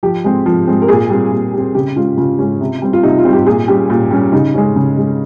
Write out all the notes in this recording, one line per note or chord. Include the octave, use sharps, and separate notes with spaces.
F3 G4
G#3 C4
F3
G#3 C4
A#4
A#2 G#4
G3 C4
A#2
G3 C4
C#3 G4
G#3 C#4 F4
C#3 F4
G#3 C#4
C3
G3 C4
F4
C3 D#4
F4
G3 C4
G4
A#2 G#4
G3 C#4 G4
A#2
G3 C#4
C#3 D#4
G#3 C#4
C#3
G#3 C#4